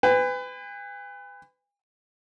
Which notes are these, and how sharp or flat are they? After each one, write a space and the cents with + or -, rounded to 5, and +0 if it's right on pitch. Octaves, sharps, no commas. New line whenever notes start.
B4 +30 G#5 -45